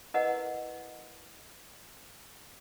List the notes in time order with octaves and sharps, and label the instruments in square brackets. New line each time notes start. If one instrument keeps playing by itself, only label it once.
[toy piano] E4 A#4 B4 D#5 F#5